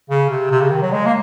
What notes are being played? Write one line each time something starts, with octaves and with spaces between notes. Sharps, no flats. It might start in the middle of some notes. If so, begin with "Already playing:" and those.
C#3
C3
C3
C#3
D#3
F#3
G#3
A#3